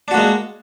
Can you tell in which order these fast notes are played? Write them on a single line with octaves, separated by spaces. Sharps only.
D4 F#4 A#3 G#3